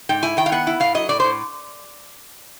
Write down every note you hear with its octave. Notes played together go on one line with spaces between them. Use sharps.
G#2 G5
E4 G#5
D#3 G5
F5
B3 F#5
E4
A2 F5
F#3 D#5
A2 D5
A2 C5